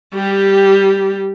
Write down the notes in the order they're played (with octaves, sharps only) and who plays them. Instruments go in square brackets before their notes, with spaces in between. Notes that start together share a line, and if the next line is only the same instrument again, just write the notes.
[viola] G3 G4